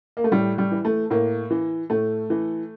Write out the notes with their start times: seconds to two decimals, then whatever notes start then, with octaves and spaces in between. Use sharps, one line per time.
0.17 A#3
0.24 A3
0.32 A2 G3
0.58 G3
0.72 E3
0.85 A3
1.10 A2 A#3
1.51 E3
1.90 A2 A3
2.30 E3